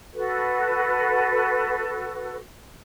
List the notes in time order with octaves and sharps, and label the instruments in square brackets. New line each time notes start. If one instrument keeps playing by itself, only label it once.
[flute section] F#4 A4 B4